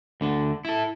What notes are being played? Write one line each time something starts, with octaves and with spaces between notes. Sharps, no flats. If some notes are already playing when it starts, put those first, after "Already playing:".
D2 D3
E4 A4